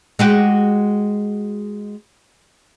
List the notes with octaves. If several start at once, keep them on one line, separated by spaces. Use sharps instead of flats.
G#3 F#4 G4